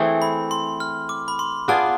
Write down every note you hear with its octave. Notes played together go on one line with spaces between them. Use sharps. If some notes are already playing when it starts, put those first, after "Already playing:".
Already playing: E3 A3 C4 G#4
B5
C6
F6
D6
B5
C6
B3 F4 G#4 D5 A5